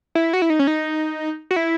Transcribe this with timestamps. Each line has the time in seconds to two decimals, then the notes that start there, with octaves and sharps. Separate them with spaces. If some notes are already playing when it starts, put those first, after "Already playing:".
0.15 E4
0.33 F#4
0.42 E4
0.50 D#4
0.59 C#4
0.67 D#4
1.51 F#4
1.56 E4